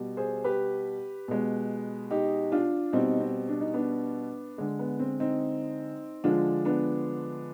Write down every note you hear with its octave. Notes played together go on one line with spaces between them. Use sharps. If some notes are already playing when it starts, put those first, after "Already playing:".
Already playing: B2 G3
G#4 C5
G4 B4
B2 G#3
D#4 G4
D4 F4
B2 G3 C4 D#4
C4
D4
D#4
B3 D4
D3 G#3
B3
C4
C4 D#4
D3 F3 G#3 D4 F4
B3 D4